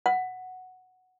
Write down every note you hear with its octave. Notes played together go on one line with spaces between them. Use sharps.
F#5